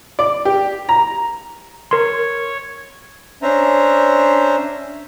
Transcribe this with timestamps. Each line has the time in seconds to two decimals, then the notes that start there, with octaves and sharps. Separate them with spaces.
0.19 D5
0.45 G4
0.89 A#5
1.91 A#4 C#5 C6
3.42 C#4 D4 C5 E5 A#5